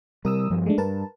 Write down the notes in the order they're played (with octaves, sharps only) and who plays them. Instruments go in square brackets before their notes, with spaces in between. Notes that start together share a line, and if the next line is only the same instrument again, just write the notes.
[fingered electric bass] C3 G3 [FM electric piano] A#4 D#6 E6
[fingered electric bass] G2 F3 G3
[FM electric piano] G#3 A3 D4
[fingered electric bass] G2 [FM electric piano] A#4 B4 A5